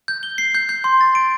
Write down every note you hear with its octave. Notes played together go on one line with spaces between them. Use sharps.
G6
G7
C7
G6
G6
C6
A6
D7